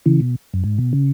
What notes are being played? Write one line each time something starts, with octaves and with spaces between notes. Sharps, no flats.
C#3 E3
B2
F#2
G#2
B2
C#3